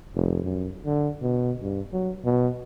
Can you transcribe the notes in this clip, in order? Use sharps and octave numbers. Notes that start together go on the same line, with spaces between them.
F1
F#2
D3
B2
G2
F#3
B2